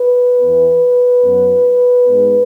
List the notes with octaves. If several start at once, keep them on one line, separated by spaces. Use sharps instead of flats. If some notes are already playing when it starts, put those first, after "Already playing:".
Already playing: B4
E2 E3 B3
F#2 F#3 B3
G#2 G#3 B3